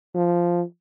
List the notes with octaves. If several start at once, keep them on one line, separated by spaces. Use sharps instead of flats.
F3